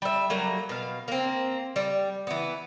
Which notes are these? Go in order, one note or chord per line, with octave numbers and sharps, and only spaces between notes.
G3 E5
F#3 G3 A#3
B2 F5
A#3 C4
G3
E3 B3